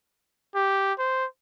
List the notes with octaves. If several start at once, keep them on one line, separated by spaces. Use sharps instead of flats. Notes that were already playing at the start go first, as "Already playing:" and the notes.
G4
C5